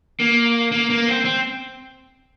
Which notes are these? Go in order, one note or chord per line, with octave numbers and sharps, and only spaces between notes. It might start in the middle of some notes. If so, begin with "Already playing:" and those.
A#3
A#3
A#3
C4
C4